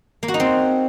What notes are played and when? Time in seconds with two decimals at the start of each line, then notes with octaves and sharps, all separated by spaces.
0.23 A#3
0.28 F#4
0.34 D#4
0.40 C4